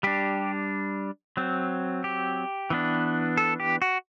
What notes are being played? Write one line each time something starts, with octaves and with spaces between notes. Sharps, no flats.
G3 D4 G4
F#3 C4
G4
E3 B3 D4
A4
G4
F#4